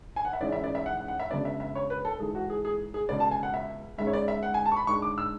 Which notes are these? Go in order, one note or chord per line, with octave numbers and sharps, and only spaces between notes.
G#5
F#5
E5
A1 G#2 E3 G#3 C#4 D5
E5
D5
E5
F#5
F#5
F#5
E5
C#2 C#3 F#3 B3 D4 D5
E5
E5
C#5
B4
A4
G#2 E3 A3 G#4
F#4
G#4
G#4
G#4
C#2 B2 A3 D5
A5
G#5
F#5
E5
G#2 G#3 C#4 E5
C#5
D5
E5
F#5
G#5
A5
C#6
B5
G#2 G#3 D4 C#6
D6
E6